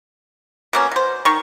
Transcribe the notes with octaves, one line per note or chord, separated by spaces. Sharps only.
B2 A#3 C#4
B2 C5
D#3 C#6